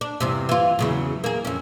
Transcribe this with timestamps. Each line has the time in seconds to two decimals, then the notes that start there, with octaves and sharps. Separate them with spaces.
0.01 D4
0.20 E2 G2 C3
0.49 E3 F4
0.79 E2 C#3 F#3
1.24 A#3 G#4
1.45 F2 C#4